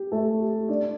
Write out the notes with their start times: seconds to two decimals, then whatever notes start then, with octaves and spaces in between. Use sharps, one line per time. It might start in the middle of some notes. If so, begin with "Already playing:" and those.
Already playing: G4
0.12 A3 A4
0.40 G4
0.69 D4 D5